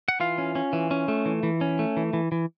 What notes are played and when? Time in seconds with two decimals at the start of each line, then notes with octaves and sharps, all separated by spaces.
0.08 F#5
0.20 E3 F4 F5
0.38 C#4
0.55 C#4
0.73 E3
0.91 C#4
1.08 A3
1.26 E3
1.43 E3
1.61 C#4
1.79 A3
1.97 E3
2.13 E3
2.32 E3